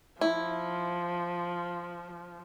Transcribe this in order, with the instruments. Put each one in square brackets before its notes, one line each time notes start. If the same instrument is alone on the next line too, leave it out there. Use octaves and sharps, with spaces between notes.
[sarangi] F3 [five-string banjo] E4